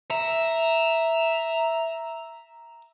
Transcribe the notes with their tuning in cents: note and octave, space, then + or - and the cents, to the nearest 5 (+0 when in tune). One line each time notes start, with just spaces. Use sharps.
E5 +0 A#5 +0